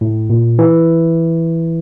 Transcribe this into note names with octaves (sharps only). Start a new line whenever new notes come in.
A2
A#2
E3